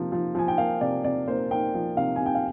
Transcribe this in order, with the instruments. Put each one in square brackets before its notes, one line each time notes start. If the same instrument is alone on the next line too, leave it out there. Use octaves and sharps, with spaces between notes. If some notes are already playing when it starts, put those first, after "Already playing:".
Already playing: [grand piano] C3 F3 A#3
F3
F3 G#5
G5
A#3 F5
C3 D5
C3 D5
A#3 C5
A#3 G5
F3
C3 F5
G#5
C3
G5
F5